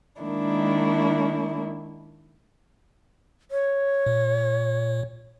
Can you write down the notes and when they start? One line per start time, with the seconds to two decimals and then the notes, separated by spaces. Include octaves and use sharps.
0.21 D#3 G#3 A#3 D4 E4
3.51 C#5
4.06 A#2